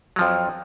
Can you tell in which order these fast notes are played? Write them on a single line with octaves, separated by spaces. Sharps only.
F#3 F3 F2